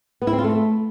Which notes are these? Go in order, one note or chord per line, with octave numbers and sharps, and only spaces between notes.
B3
E4
C4
F4
A3